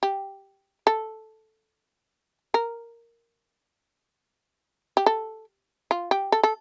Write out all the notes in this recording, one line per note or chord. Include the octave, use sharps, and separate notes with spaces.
G4
A4
A#4
G4
A4
F4
G4
A4
A4